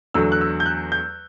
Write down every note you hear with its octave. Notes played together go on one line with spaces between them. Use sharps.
E2 D3 F#3 A3 E6
F#6
E6
G6
F#6
G6